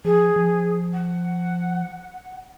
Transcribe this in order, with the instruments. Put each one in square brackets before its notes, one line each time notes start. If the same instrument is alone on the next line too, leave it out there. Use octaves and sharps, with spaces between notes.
[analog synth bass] F3 [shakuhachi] G#4
[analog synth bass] F3
[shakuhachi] F#5